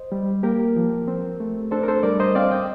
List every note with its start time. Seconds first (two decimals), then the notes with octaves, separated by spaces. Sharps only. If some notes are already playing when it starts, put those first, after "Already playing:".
Already playing: C5 D#5
0.12 G3
0.43 A#3 G4 A#4
0.76 F3
1.08 C4
1.40 A3
1.71 D4 A4 C5
1.83 A#4
1.88 A4 C5
2.03 G3 A#4 D5
2.20 C5 D#5
2.35 C4 D5 F5
2.51 D#5 G5